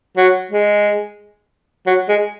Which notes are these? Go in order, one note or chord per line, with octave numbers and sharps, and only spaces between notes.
F#3
G#3
F#3
G#3